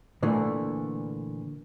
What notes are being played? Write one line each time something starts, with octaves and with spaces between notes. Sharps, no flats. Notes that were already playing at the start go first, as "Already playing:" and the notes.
A#2 D3 E3 A3 A#3